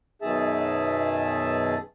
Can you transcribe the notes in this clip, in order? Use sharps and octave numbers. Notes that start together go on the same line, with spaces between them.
F#2 B2 D#3 G#4 E5 A5